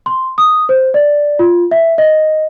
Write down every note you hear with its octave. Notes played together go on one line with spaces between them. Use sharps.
C6
D#6
C5
D5
F4
E5
D#5